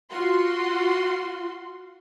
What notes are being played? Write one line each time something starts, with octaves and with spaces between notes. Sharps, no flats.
F4 F#4 C6